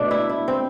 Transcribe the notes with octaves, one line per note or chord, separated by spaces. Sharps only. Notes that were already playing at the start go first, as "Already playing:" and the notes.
Already playing: B2 A3 D4
E4
E4
C4